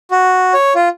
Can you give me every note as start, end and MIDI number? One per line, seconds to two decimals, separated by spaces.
0.11 0.53 66
0.54 0.73 73
0.75 0.89 65